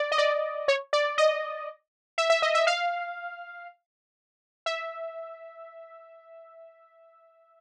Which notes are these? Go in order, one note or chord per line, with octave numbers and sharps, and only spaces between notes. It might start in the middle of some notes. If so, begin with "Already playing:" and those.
Already playing: D5
D#5
D5
C#5
D5
D#5
E5
E5
D#5
E5
F5
E5